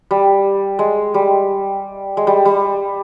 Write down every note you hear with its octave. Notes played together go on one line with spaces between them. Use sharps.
G3
G#3
G3
G#3
G3
G3